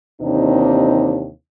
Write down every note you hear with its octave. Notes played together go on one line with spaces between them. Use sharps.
D#2 C3 E3 C4 D4 D#4